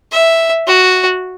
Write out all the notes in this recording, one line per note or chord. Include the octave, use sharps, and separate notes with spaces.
E5
F#4